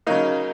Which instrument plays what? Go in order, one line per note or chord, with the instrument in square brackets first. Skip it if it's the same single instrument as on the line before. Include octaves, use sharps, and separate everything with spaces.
[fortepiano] C#3 F#3 A#3 D#4